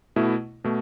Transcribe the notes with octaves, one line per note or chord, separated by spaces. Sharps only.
B2 A3 E4
B2 A3